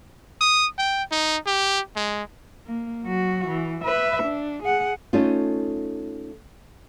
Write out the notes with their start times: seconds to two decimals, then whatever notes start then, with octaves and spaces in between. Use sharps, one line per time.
0.41 D#6
0.78 G5
1.11 D#4
1.47 G4
1.96 G#3
2.67 A#3
3.04 F#3 F#4
3.47 E3
3.84 B4 E5
4.23 D4
4.64 G#4 F#5
5.13 A3 C#4 D#4 F4